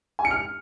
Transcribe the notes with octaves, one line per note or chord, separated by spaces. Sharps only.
G#5
C#7
F6